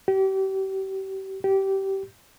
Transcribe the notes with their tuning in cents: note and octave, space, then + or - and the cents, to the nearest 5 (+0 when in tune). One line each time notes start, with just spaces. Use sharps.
G4 -35
G4 -20